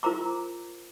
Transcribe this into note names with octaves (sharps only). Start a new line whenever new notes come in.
F4 A#4 C5 A#5 D6